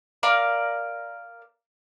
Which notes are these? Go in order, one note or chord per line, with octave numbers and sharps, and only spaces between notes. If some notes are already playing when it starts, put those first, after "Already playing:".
A#4 D5 F5